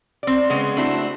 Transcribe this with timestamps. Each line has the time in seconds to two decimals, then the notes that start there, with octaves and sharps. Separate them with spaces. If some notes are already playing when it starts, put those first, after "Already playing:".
0.23 C4 D5
0.50 C#3 G#3 B3
0.76 A3 C4 D4 E4 F#4